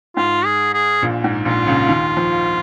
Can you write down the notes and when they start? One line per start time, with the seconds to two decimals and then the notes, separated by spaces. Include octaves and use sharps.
0.16 G#2 F4
0.45 G#4
0.74 G#4
1.02 A#1 A#2
1.24 G#2
1.45 A#1 A#2 F4
1.66 C#2 C#3
1.88 D#2 D#3
2.17 F3